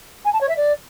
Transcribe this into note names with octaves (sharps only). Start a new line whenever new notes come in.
G#5
A5
C#5
E5
D5